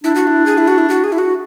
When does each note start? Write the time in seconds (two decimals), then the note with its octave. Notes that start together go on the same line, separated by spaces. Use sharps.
0.03 D4 E4
0.15 F#4
0.27 E4
0.46 G#4
0.58 E4
0.68 F#4
0.78 E4
0.89 F#4
1.04 G#4
1.12 E4
1.18 F#4